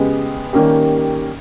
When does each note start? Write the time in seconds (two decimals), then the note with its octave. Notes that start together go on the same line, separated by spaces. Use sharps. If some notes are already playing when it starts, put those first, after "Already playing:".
Already playing: C#3 G#3 B3 G4 B4
0.53 D#3 G3 A#3 C#4 G4